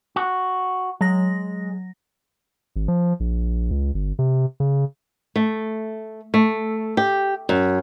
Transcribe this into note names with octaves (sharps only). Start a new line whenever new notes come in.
F#4
F#3 G#3 A#6
G#1
F3
A#1
C#2
G1
C3
C#3
A3
A3
G4
F#2